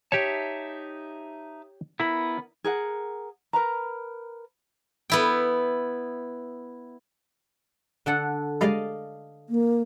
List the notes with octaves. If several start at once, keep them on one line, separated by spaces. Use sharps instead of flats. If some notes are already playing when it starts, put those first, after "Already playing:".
D#4 G4 C#5 E5 A5
B3 E4 A#4 B5
G#4 A#4 F#5
A#4 B4 A#5
B3 E4 G5
D3 A4 F#5
G3 G#3 D5 D#5 F5
A#3